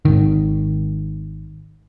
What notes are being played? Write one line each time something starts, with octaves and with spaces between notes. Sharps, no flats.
G#1 D#3